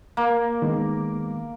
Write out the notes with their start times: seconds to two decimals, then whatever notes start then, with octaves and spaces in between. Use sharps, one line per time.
0.17 A#3
0.62 D#3 G#3 B3